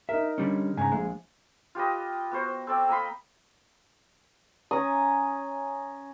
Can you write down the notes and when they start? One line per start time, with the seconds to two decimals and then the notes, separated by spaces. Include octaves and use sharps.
0.09 D#4 A#4 E5
0.38 D3 G3 C#4
0.77 G#2 C#3 G#5 A#5
0.92 A#1 G#3
1.75 F4 G4 B4 D#5
2.31 B3 F#4 C5
2.67 C4 A4 D5 G5
2.89 A#3 D#5 B5 C6
4.71 C#4 A#5 D#6